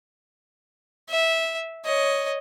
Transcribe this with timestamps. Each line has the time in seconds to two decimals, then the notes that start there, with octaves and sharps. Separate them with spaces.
1.09 E5
1.85 C#5 D#5